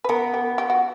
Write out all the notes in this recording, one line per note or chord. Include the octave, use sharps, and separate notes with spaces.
B4
B3 A#4
G4
G4
F#4